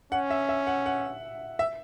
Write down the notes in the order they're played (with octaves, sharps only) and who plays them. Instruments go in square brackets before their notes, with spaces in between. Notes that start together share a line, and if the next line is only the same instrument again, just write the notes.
[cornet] C#4 [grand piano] F#5
[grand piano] E5
E5
F#5
F#5
E5